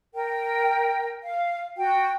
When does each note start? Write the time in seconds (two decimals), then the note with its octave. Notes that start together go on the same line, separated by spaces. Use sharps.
0.15 A#4 G5
1.23 F5
1.77 F#4 G5